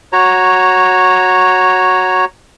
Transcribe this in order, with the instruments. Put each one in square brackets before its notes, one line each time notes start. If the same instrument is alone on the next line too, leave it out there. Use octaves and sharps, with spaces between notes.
[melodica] F#4 C#5 A#5